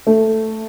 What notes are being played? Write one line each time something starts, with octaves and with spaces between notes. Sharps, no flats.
A3